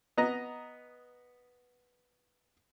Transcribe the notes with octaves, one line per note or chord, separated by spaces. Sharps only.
B3 D#5 A#5